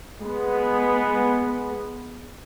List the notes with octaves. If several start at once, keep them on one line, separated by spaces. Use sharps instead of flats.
G#3 B3